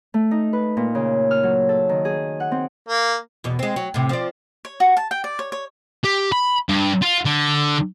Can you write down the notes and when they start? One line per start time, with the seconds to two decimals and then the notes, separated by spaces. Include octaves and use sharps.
0.14 A3
0.31 D#4
0.53 B4
0.77 A#2
0.95 C#3
1.31 F6
1.43 F#3
1.69 A4
1.89 D#3
2.05 G#4
2.40 F#5
2.51 C4
2.89 A#3
3.44 E2 B2
3.59 G#3 C4
3.76 F#3
3.94 A2 C3
4.09 F3 D5
4.65 C#5
4.80 F#4
4.97 A5
5.11 G5
5.24 D5
5.39 C#5
5.52 C#5
6.04 G4
6.32 B5
6.69 G2
7.02 F4
7.25 D3